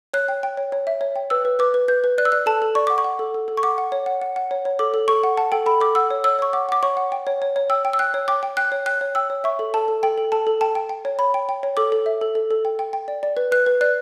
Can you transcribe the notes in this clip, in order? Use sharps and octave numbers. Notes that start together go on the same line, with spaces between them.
C#5 F#6
G5
G5
C#5
C#5
E5
C#5
G5
B4 E6
B4
B4 D6
B4
B4 G6
B4
D5 F#6
E6
D5 F#6
A4 A5
A4
D5 C#6
F#5 D6
C#6
F#5
A4
A4
A4
C#6
F#5 D6
F#5
C#5
F#5
F#5
F#5
C#5
C#5
A4 D6
A4
A4 C#6
F#5
F#5 A5
A4 G5
A4 B5
A4 D6
F#5 E6
C#5
C#5 E6
C#5 C#6
F#5 D6
F#5 D6
C#5 C#6
F#5
G5
C#5
C#5
C#5
G5 E6
G5
E6
G5 F#6
C#5
G5 D6
G5
G5 F#6
C#5
G5 F#6
C#5
G5 E6
C#5
E5 C#6
A4
A4 A5
A4
A4 G5
A4
A4 A5
A4
G5 A5
G5
G5
C#5
C#5 B5
G5
G5
C#5
A4 D6
A4
E5
A4
A4
A4
G5
G5
G5
D5
D5
B4
B4 F#6
B4
D5 F#6